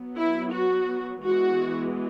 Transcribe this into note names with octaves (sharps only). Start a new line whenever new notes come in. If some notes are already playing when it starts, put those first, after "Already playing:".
Already playing: F#3 B3
E4
F#4
E3 G#3 B3 F#4